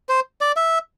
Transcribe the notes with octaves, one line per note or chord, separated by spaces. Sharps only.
C5
D5
E5